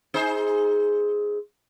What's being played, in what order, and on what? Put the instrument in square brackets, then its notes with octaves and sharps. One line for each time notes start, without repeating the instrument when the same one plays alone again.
[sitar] D#4 G#4 C5